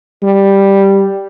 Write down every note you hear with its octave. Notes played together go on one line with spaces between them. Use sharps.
G3